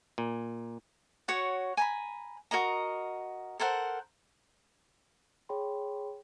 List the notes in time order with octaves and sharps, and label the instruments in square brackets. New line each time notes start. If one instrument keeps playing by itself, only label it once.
[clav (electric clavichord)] A#2
[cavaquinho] F#4 C#5 F#5
G#5 A#5 B5
F#4 A#4 D#5 A#5
A4 A#4 C5 F#5
[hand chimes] G#4 C#5 G5 B5 C6